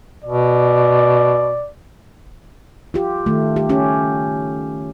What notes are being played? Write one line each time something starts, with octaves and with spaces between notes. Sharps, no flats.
B2 D5
F4 G4
D#3 A3
G4
C#4 G4